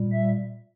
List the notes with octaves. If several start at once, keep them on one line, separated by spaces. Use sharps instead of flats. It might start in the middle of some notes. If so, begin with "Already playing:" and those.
Already playing: A#2 G3
E5